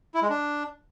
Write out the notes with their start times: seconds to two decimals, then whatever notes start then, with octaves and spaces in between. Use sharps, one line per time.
0.14 E4
0.22 G#3
0.30 D4